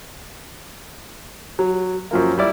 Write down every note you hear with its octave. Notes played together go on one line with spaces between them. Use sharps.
F#3
F#2 F3 A#3
G3 E4 D5